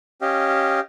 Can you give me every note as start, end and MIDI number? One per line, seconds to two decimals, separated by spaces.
0.22 0.80 61
0.22 0.80 67
0.22 0.80 75
0.22 0.80 77